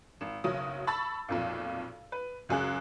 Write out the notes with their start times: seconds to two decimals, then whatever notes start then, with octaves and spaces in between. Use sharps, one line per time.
0.21 G#1
0.44 F#1 B1 F#3 D#6
0.87 A5 B5 C#6 E6 A6
1.29 B1 F2 A#2
2.12 B4
2.49 C#2 F#2 G#4 F#6